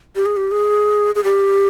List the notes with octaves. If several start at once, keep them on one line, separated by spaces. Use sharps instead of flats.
G4
G#4
G4
G#4
G#4
G4